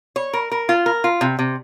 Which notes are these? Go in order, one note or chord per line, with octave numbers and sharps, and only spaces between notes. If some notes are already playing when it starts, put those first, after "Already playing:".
C#5
A#4
A#4
F4
A#4
F4
C3
C3